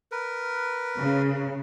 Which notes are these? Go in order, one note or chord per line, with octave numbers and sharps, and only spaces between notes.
A#4 B4
C#3